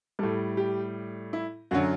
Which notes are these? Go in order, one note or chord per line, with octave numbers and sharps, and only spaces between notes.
A2 G3 A4
G4
E4
F#2 D3 F#3 F#4